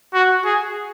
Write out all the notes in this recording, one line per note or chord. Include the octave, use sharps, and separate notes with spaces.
F#4
G#4